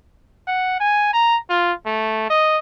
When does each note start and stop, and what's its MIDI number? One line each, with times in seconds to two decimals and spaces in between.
0.47 0.80 78
0.80 1.10 80
1.13 1.36 82
1.50 1.72 65
1.86 2.30 57
2.30 2.58 75